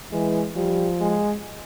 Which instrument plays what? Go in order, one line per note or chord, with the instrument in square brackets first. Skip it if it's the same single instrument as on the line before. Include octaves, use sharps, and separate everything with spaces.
[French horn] E3 [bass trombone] G#3
[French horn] F3 [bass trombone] G3
[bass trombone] G#3